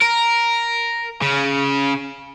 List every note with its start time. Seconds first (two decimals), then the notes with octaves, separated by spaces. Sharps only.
0.02 A#4
1.22 C#3